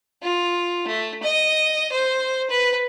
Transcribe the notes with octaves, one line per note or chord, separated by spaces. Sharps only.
F4
A3
D#5
C5
B4